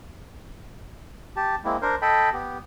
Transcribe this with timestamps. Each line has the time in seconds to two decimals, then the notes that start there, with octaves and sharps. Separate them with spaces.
1.36 G4 A5
1.65 G#3 A#3 C4 E4
1.82 D4 A#4 C5
2.02 A4 D#5 G5 A5 B5
2.33 B3 G4